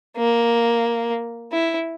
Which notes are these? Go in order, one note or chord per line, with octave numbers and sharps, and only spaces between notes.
A#3
E4